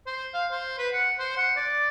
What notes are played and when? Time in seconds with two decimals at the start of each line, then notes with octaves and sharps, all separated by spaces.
0.07 C5
0.34 F5
0.52 C5
0.78 B4
0.93 F#5
1.19 C5
1.37 F#5
1.57 D5